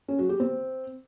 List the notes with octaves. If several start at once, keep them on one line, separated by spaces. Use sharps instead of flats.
C#4
F#3
G4
C4